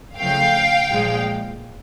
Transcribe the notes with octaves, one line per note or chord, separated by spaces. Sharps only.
C#3 F3 A3 F5 G5
A#2 F3 G#3